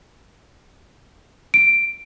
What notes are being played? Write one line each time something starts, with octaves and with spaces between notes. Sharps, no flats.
D7